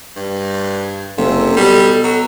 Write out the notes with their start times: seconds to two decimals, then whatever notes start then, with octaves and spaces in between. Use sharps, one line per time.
0.16 G2
1.18 F#1 C3 A4
1.56 B2 G3
2.04 F#3